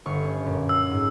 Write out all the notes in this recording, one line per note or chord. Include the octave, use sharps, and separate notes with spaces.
G1 C#6 F6
C#4
F#2 A#2
E6
G#2